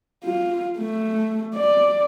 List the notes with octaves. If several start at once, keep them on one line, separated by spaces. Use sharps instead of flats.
F4
A3
D5